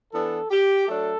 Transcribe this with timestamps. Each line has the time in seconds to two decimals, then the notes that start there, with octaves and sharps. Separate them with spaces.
0.13 E3 B3 D4 A4
0.51 G4
0.88 F#3 A3 D4 A4